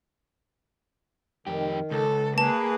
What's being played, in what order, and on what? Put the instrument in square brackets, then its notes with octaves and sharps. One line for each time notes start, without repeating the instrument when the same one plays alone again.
[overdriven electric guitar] F2 G4 [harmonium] D#3
[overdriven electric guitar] C#2 [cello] A4
[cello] A#3 [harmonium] G#4 B4 [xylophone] A5